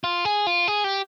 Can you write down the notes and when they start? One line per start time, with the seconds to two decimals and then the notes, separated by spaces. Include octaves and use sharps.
0.04 F4
0.25 G#4
0.47 F4
0.68 G#4
0.84 G4